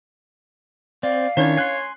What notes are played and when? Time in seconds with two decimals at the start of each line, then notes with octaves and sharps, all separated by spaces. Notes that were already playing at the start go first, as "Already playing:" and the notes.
1.03 C4 D5 F5
1.37 D#3 C#4 D4 E4 C#5
1.57 G#5 C6 F#6 C7